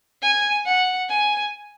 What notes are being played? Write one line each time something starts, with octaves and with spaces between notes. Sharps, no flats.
G#5
F#5
G#5